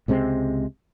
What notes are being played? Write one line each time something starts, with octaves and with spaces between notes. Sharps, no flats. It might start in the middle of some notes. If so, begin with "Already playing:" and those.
C#2 C3 G#3 C4